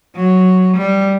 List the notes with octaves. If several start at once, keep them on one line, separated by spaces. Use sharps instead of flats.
F#3
G3